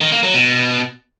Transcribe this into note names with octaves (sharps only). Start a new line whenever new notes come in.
D#3
A#3
F#3
B2